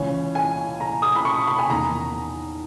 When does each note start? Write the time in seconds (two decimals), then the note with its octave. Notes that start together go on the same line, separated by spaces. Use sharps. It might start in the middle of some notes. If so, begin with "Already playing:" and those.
Already playing: C#2 C#3 E3 C#5
0.35 G#5
0.80 A#5
1.02 D#6
1.16 B5
1.25 C#6
1.47 B5
1.59 G#5
1.70 E2 D#3 A#5